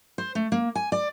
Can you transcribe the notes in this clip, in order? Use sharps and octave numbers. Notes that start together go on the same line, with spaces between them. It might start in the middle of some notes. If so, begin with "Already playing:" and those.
C5
A3
A#3
G#5
D5